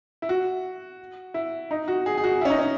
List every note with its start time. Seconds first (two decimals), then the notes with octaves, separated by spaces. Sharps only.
0.22 E4
0.29 F#4
1.34 E4
1.71 D#4
1.88 F#4
2.06 G#4
2.17 G#4
2.24 F#4
2.41 C#4 E4
2.50 D#4
2.59 C#4